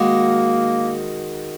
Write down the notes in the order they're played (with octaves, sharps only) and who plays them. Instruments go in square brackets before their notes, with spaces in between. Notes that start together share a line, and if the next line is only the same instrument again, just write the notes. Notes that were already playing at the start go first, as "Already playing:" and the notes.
Already playing: [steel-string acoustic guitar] D#3 G#3 F#4 [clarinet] A#3